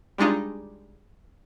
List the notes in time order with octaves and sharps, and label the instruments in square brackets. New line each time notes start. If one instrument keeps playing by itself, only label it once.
[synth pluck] G3 G#3 D4 D#4 F4